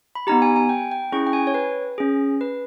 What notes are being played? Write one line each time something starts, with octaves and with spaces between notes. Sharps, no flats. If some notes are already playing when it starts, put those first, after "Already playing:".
B5
B3 D#4 G4 A#5
G#5
G#5
G5
G5
C#4 E4 G#4 C#6
G5
G#5
C#5
B4
C#4 G#4
B4